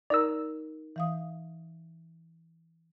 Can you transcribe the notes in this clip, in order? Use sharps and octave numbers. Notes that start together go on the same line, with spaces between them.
D#4 A#4 D5 A#5 E6
E3 F5 D#6